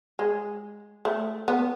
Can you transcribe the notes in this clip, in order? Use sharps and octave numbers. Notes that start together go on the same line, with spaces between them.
G#3
A3
B3